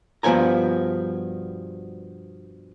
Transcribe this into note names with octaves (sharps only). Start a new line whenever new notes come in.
G2 B2 F3 B3 G#5 A#5